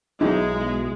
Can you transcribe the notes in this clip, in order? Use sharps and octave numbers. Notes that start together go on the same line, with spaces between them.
B1 G#3 D#4 E4